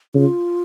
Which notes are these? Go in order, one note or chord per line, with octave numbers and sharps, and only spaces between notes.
C#3 F4